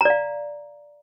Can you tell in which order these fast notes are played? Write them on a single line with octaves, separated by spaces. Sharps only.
A#5 D5 F5